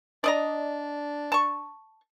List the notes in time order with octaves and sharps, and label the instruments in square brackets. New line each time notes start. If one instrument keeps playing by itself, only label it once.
[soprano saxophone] D4 [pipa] D5 D#5 A#5
[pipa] A5 C#6